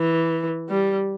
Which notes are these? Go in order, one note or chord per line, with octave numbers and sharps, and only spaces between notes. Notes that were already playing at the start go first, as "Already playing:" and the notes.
Already playing: E3
G3